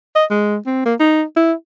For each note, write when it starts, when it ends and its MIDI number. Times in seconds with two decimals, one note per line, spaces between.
0.15 0.25 75
0.30 0.57 56
0.66 0.84 60
0.86 0.94 58
0.99 1.23 63
1.36 1.53 64